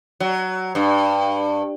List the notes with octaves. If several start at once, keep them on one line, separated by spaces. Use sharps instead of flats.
F#3
G2